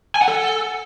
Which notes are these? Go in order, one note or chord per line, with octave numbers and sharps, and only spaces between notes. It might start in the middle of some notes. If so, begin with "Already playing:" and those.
G#5
F#5
A4